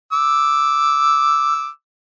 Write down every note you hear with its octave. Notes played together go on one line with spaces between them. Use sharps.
D6 E6